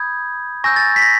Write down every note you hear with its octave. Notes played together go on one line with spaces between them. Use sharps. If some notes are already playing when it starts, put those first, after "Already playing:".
Already playing: B5 D#6 G6 G#6
G#5 C#6 E6 G6 A#6
A6
B6
A#6